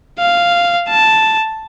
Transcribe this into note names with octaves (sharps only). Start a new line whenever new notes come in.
F5
A5